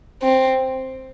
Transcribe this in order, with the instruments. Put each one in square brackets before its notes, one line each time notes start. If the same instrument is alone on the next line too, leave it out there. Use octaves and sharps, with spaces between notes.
[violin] C4